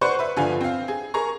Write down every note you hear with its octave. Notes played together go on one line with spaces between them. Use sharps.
B4 C5 D5 F#5 C6 C#6
B4 E5
G1 D3 F3 F4 G#5
C4 F5
G#4
G#4 A#4 A#5 C#6